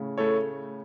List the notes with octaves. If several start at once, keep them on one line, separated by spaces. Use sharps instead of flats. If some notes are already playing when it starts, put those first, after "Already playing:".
Already playing: A2 C#3
A3 E4 A4 C#5